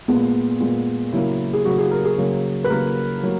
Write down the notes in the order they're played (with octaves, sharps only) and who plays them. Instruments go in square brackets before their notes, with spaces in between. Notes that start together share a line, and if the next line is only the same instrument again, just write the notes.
[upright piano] A#2 G#3 B3
A#2 G#3 B3
C#3 F#3 A#3 E4
G#4
C#3 F#3 A#3 F#4
G#4
A#4
G#4
C#3 F#3 A#3
B4
C#3 F#3 A#3 A#4
F#3 A#3